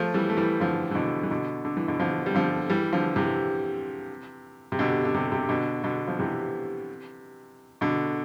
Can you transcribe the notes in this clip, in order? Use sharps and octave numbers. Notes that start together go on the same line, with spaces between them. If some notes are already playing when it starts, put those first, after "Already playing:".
Already playing: F3 A3
E3 G3
A3
E3 G3
D3 F3
E3
B2 D3
E3
B2 D3
D3
E3
B2 D3
D3 F3
G3
D3 F3
E3 G3
D3 F3
C3 E3
C3
B2 D3
D3
C3
C3
B2 D3
B2 D3
F3
C3 E3
B2 D3